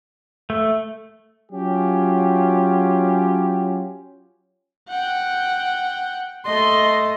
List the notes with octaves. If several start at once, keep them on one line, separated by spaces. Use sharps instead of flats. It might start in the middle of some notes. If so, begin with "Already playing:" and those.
A3
F#3 C#4 F4 G4
F#5 G5
A3 A4 D#5 C6